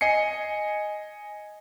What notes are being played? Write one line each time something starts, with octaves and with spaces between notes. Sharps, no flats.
D#5 G#5 C7 C#7